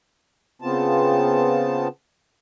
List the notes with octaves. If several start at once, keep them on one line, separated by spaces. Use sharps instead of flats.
C#3 B3 C4 F4 A5